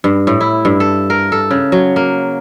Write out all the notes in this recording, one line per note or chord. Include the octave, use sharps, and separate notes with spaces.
G2
A2
E4
G2
A4
A#4
A4
C#3
F#3
A#3